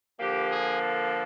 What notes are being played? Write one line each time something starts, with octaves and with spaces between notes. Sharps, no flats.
D3 F3 A#3 G4
G#4
A4